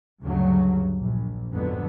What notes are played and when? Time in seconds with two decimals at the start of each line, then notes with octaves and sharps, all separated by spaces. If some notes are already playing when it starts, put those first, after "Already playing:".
0.22 D2 G2 C#3 F#3
0.98 A#1
1.52 F2 G#2 D3 F#3 B3